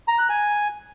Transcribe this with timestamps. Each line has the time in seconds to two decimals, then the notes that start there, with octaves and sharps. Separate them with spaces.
0.08 A#5
0.19 F#6
0.29 G#5